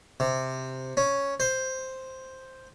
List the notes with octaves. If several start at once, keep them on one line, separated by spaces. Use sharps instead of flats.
C3
C#4
C5